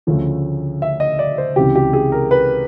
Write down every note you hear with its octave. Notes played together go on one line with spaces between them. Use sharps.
D2 C#3 F3 A3 C#4
E5
D#5
D5
C5
C#2 C3 E3 G4
G4
G#4
A#4
B4